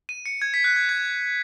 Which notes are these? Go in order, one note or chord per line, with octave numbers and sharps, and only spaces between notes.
D#7
C#7
G#6
B6
F#6
G#6
G#6